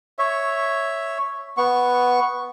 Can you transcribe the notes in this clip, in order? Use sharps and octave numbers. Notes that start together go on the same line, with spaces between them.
C#5 E5
B3 C#6